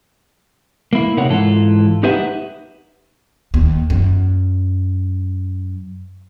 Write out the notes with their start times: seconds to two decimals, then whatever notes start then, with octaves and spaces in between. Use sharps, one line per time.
0.93 A#3 E4
1.17 C3 D#4 A#4 C#5 F#5
1.30 G#2 E3 F4 A4
2.03 D#4 G4 B4 E5 F#5
3.54 D#2
3.90 F#2